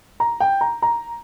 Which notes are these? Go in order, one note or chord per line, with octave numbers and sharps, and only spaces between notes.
A#5
G5
A#5
A#5